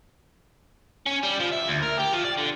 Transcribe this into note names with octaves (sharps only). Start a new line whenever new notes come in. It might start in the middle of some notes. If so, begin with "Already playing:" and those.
C#4
G3
F3
E5
D2
A#4
G4
F3
D5
D3